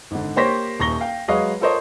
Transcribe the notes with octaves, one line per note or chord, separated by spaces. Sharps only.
G#1 D3
A#3 G4 C5 C#5 A#6 B6
D#1 A#5 C#6 A#6 G7
F5 G5
F#3 G#3 B4 C#5 D#5 F5
F4 A4 A#4 C5 C#5 D#5